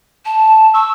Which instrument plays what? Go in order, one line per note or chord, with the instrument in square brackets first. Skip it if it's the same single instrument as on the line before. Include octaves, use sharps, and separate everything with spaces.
[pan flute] A5
[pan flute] C#6 [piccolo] E6